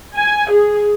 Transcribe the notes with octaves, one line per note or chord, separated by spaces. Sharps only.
G#5
G#4